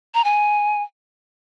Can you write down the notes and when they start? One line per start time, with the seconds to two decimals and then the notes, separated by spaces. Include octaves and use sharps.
0.14 A#5
0.24 G#5